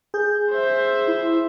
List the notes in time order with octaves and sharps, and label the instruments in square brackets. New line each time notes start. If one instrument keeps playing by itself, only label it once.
[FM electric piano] G#4 [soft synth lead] G6
[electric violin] C5 E5
[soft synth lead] E4